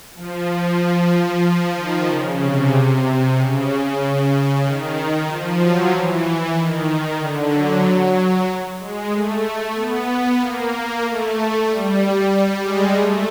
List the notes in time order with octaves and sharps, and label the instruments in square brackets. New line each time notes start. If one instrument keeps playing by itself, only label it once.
[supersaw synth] F3
F3
D#3
C#3
C3
C#3
D#3
F3
F#3
E3
D#3
D3
F#3
G#3
A3
B3
A#3
A#3
A3
G3
G#3
A3